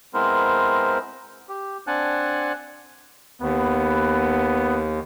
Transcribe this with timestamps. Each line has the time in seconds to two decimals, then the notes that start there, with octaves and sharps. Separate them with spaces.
0.14 G#3 B3 C4 E4 A#4 C5
1.49 G4
1.87 C4 D4 F#5 G#5 A5 F#6
3.42 D#2 B3